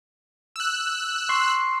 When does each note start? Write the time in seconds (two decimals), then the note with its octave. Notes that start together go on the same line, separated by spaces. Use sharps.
0.56 E6 F#6
1.29 C6 C#6 C7